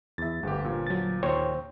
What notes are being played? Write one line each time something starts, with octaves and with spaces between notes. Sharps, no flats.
E2 E5 A6
G1 D2 G2 G4
A#2 F3
F#3 A6
D#2 C5 C#5 G5